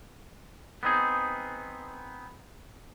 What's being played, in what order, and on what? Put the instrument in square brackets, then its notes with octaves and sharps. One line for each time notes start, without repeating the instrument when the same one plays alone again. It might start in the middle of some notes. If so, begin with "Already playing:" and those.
[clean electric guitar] B3 C4 D#4 G#4